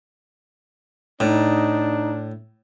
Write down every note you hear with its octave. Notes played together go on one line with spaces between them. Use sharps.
A2 D4 D#4